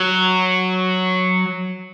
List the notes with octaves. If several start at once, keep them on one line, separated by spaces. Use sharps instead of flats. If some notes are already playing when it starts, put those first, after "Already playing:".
Already playing: F#3